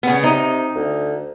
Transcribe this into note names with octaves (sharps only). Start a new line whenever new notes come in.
C#3 B3
C3 D#4
D2